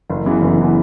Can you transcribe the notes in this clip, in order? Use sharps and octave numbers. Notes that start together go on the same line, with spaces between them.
F#1
F#2 C#3 E3 B3
F#1
C#3 E3 B3